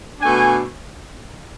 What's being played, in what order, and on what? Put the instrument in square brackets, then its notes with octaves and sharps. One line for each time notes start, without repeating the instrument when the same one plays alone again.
[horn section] B2 A3 D4 G#5